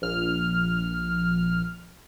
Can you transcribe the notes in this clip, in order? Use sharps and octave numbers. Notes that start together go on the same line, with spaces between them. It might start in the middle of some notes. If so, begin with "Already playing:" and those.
A#1 F6